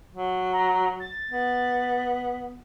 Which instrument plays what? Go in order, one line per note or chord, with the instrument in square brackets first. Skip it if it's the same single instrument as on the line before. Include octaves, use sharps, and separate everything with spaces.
[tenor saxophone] F#3
[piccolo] A#5
A6
[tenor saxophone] B3